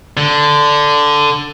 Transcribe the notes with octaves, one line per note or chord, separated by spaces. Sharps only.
D3